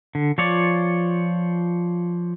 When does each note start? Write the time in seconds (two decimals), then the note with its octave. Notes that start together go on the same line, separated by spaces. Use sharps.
0.15 D3
0.38 F3 F4 C#5 D5